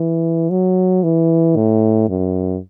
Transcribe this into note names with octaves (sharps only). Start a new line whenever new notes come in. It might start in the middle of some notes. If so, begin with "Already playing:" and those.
Already playing: E3
F#3
E3
A2
F#2